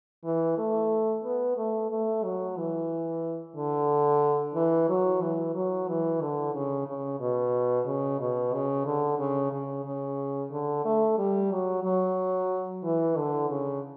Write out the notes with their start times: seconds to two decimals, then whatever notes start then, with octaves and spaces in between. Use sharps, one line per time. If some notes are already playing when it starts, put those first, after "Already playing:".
0.24 E3
0.58 A3
1.24 B3
1.57 A3
1.91 A3
2.24 F#3
2.57 E3
3.56 D3
4.55 E3
4.89 F#3
5.22 E3
5.55 F#3
5.88 E3
6.21 D3
6.54 C#3
6.87 C#3
7.20 B2
7.87 C#3
8.20 B2
8.53 C#3
8.86 D3
9.19 C#3
9.52 C#3
9.85 C#3
10.51 D3
10.85 A3
11.18 G3
11.51 F#3
11.84 F#3
12.84 E3
13.17 D3
13.50 C#3